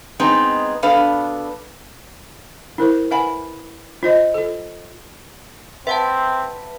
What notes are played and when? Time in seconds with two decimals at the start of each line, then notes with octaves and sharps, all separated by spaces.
0.19 G#3 B3 C4 D#4
0.83 B2 D4 A4 B4 F5
2.78 E4 A#4 C5
3.11 B4 E5 F#5 G#5 B5
4.03 F4 C5 D#5
4.34 F4 A4
5.87 C4 B4 E5 F#5 A5